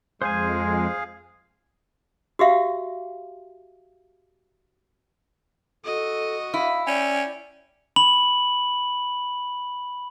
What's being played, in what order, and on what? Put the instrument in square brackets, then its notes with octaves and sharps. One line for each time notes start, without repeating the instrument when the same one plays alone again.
[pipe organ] F2 G#3 [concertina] G#4 F5 [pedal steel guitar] C5 G#5
[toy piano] F#4 G4 E5 F5
[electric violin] F#4 D#5 [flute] A4
[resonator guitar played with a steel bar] E4 [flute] F5
[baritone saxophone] C#4 [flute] D5 [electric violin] G5
[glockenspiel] B5 F#7